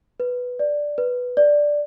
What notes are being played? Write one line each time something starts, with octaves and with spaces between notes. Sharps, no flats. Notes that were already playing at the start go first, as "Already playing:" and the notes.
B4
D5
B4
D5